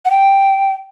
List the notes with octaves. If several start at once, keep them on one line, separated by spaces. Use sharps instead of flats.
F#5
G5